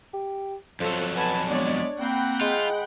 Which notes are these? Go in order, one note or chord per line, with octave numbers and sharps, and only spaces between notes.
G4
F2 F3 F#3 A4
B3 G#5 A5 B5
G#3 B3 D4 C#5 D5
A#3 C4 F#5 G5 B5
G#3 F4